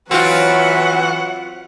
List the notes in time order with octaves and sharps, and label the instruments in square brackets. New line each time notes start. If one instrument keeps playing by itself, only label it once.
[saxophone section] E3 F#3 [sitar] C4 F4 [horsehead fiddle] B4 C#5 [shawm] F#5